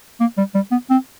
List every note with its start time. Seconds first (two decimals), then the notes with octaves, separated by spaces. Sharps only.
0.20 A#3
0.38 G3
0.55 G3
0.71 B3
0.90 C4